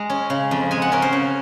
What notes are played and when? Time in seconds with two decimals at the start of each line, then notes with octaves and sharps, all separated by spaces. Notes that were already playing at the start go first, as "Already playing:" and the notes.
Already playing: G#3 A#5
0.10 C#4
0.30 C#3
0.51 F2
0.71 G#3 G#5
0.82 F#5
0.92 C#4 A#4
1.02 C5
1.13 C#3